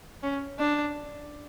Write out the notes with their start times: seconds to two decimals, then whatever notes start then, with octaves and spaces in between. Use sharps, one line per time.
0.23 C#4
0.59 D4